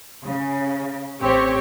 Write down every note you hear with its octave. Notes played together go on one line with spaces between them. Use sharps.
C#3
A1 C4 G4 C#5